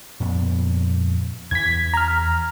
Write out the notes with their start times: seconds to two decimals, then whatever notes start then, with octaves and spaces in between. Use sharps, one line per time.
0.20 F2 A#2 B3
1.51 E2 E3 G#6 B6
1.94 A#5 F6